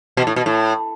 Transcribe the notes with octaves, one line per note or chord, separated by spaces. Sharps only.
B2
A2
B2
A2